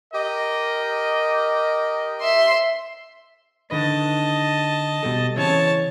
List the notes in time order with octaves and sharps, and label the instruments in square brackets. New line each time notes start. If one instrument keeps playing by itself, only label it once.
[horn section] G4 A#4 D#5
[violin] E5 C6
[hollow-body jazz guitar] D3 D#3 B4 [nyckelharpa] D#5 A5
[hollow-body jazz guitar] B2 G3 A4
[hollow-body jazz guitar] C#3 E3 C4 [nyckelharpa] C#5 A5